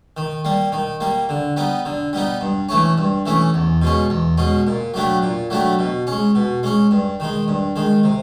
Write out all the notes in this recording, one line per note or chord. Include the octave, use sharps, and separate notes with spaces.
D#3
G3 A#3
D#3
G3 A#3
D3
G3 B3 D#4
D3
G3 B3 D#4
G2
E3 A3 C#4
G2
E3 A3 C#4
E2
B2 G#3 C#4
E2
B2 G#3 C#4
A#2
F#3 A3 D4 G4
A#2
F#3 A3 D4 G4
B2
G#3 C#4
B2
G#3 C#4
G2
D#3 G#3
G2
D#3 G#3
C3